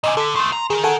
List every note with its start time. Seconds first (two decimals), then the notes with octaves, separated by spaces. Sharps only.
0.04 A#2 D3 D#5 G#5
0.17 D3 A4 B6
0.36 D#3 A3 C6
0.53 A#5
0.70 D#3 G#4 A#4
0.84 A4 F#5 G#5